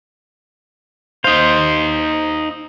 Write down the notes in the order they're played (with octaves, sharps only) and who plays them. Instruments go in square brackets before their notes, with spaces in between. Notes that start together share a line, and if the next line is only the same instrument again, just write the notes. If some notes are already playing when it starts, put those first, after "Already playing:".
[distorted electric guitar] D#4 F5 [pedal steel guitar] C5